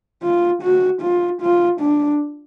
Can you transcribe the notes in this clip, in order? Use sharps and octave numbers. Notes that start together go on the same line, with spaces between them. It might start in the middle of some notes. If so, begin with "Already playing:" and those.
F4
F#4
F4
F4
D4